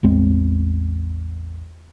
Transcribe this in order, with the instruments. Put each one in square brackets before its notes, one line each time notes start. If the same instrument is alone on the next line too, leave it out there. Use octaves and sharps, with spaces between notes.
[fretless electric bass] A1 E2 G#3 C4